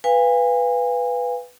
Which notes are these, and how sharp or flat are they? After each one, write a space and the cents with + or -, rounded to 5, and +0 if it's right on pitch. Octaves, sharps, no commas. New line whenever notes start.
B4 +0 F5 +0 G#5 -35